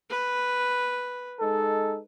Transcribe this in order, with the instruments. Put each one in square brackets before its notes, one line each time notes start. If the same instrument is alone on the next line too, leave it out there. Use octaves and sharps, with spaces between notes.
[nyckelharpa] B4
[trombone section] G#3 D#4 A4